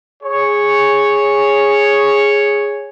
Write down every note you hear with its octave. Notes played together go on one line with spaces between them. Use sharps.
G#4 C#5